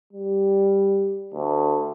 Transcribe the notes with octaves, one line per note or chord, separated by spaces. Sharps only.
G3
D2